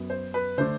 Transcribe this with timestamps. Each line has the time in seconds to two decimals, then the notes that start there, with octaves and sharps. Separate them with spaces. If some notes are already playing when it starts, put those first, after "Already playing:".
Already playing: F#2 F#3 B3
0.10 C5
0.34 B4
0.58 D3 A3 D4 C5